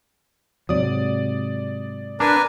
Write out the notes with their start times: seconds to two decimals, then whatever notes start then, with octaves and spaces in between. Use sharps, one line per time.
0.69 G#2 C3 F#3 D5 D#6
2.20 D4 A#4 B4 G#5